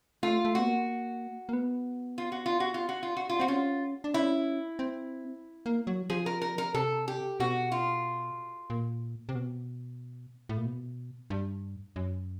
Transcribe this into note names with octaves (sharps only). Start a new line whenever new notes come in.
A3 F4
A3
B3 F#4
A#3
A#3
B3
F4
F#4
F4
F#4
F4
F#4
F4
F#4
F4
C4 F#4
C#4 F4
D4
C#4 E4
C4
A#3
F#3
F3 G#4
A#4
A#4
A#4
C3 A4
G4
B2 F#4
F4
A#2
C3
B2
A2
A#2
B2
G2
F#2